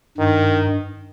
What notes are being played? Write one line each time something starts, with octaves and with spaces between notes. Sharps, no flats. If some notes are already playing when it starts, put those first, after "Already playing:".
G2 D#3